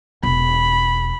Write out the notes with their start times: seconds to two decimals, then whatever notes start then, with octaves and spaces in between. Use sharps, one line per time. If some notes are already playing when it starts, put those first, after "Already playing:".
0.23 E1 B5